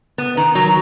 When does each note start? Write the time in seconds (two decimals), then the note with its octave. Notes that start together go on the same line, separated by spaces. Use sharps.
0.18 B3
0.37 D#3
0.55 F#3